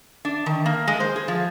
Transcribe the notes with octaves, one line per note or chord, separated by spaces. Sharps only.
D4
D#3
A#3
G#3
C5
G#4
F3